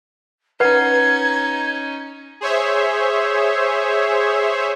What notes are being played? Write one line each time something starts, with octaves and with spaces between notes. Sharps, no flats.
C#4 D#4 B4 F#5 G#6
G#4 C5 C#5 E5